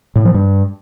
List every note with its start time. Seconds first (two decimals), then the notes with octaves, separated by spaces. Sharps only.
0.16 A2
0.25 F3
0.34 G2